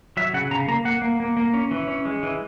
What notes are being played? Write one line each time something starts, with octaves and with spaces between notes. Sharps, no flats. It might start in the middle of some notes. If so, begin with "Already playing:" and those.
F#3 E5
C#3 F#5
C#3 A#5
A#3 A#5
A#3 F#5
A#3
A#3
A#3
C#4
E3
C#4
G#3
E3